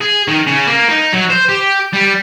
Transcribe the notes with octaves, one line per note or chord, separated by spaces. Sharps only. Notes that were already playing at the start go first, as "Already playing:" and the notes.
G#4
D#3
C#3
A#3
D#4
F#3
C5
G4
G3